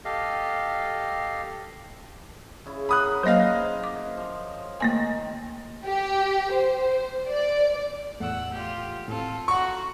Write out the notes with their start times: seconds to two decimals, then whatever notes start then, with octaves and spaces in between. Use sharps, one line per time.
0.05 G4 A4 D#5 F5
2.66 C#3 E4
2.89 G#4 A#4 F#5 B5 D#6 F#6
3.23 F#3 A#3 C5 D#5 F5
3.84 D6
4.17 F3
4.80 D#3 A3 A#3 C4 G#5
5.85 G4
6.53 C5
7.28 D5
8.20 E2 A2 A3 F#5 E6
8.53 F4 G4
9.08 A2 C4 F4 A4
9.48 F#4 F#5 A#5 C#6